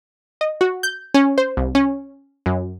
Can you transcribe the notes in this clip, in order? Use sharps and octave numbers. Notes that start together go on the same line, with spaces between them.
D#5
F#4
G6
C#4
C5
C2
C#4
F#2